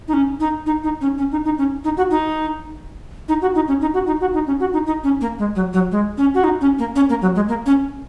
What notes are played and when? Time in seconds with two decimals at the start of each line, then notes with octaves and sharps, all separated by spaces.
0.08 D#4
0.13 C#4
0.40 D#4
0.66 D#4
0.84 D#4
1.01 C#4
1.18 C#4
1.32 D#4
1.45 D#4
1.58 C#4
1.84 D#4
1.97 F#4
2.11 D#4
3.29 D#4
3.42 F#4
3.55 D#4
3.68 C#4
3.81 D#4
3.94 F#4
4.07 D#4
4.21 F#4
4.34 D#4
4.47 C#4
4.60 F#4
4.73 D#4
4.87 D#4
5.04 C#4
5.21 A#3
5.39 G#3
5.55 F#3
5.73 F#3
5.92 G#3
6.18 C#4
6.34 F#4
6.44 D#4
6.61 C#4
6.79 A#3
6.96 C#4
7.09 A#3
7.22 F#3
7.35 G#3
7.48 A#3
7.66 C#4